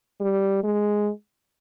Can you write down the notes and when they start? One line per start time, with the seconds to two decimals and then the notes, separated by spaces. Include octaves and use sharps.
0.21 G3
0.64 G#3